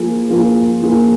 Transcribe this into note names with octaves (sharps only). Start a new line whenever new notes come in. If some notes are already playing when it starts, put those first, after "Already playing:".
Already playing: F3 A#3 F4 G#4
F3 A#3 F4 G#4
F3 A#3 F4 G#4